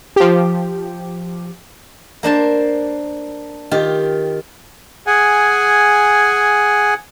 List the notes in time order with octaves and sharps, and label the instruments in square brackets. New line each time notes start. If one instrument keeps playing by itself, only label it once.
[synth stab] F3 G4
[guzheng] A#3 D4 C5 A5
D#3 F4 G4
[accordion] G#4 F#5 G#5